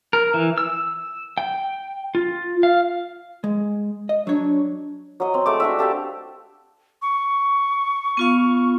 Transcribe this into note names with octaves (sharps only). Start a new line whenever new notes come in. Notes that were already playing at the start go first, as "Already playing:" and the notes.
A#4
E3
E6
G5
F4
F5
G#3
D#5
F#3 D4 C#5
F#3 D#5
C4
G#3 A3 D6
D4 F#4 E5
G4 A4 F5 G5
C#6
B3 F4 F5